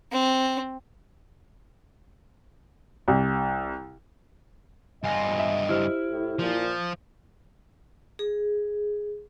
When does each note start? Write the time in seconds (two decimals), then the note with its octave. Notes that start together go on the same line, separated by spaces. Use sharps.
0.12 C4
3.08 C2
5.04 G2 F4 D#5 G#5 A#6
5.39 E5
5.69 E4 G4 C5 F6
6.09 A2
6.39 A#2 F3
8.19 G#4